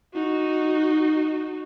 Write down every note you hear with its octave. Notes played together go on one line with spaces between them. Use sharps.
D#4 F#4